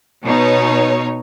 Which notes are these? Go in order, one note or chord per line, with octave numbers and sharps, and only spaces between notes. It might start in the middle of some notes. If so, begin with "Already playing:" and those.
B2 D#4 C#5